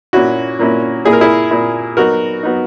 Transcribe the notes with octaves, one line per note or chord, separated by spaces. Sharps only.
A#2 A#3 C#4 E4 F#4
A#2 A#3 C#4 E4
A#2 A#3 E4 G#4
A#4
E4 G#4
A#2 A#3 E4
F#3 B3 D#4 F#4 A#4
F#3 B3 D#4